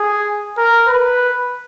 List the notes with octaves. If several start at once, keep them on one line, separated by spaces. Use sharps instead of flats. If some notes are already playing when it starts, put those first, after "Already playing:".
Already playing: G#4
A#4
B4